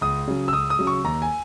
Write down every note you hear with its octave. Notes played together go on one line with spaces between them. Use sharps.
C#2 D#6
C#3 F#3
E6
C#2 D#6
D#6
C#3 F#3
C#6
D#2 A#5
G#5